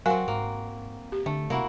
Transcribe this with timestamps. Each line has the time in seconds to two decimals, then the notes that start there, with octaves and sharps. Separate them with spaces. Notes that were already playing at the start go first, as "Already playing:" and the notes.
0.06 F#3 C4 F#4 A#4 F5 G#5
0.28 G#2 A#3
1.12 G4
1.26 D3 A3
1.50 C3 A#3 E4 F#4